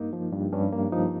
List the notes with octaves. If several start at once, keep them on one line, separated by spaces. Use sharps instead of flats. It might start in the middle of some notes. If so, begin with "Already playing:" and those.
Already playing: G2 A#3 D#4
F3
G2
G2 C#4
A#3
F3 D#4